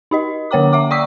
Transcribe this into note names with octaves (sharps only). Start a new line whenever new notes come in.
D#4 G4 D#5
D3 A#3 C#5 G5 A#5 D6
E5 F#5 D6
D5 G5 C#6 D#6 E6 B6